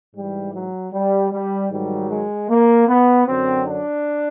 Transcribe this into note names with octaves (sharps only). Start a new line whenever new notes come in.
G#2 E3 G3
F#3
G3
G3
G#2 D#3 F#3 G3
G#3
A#3
B3
F#2 D3 F#3 C4
D4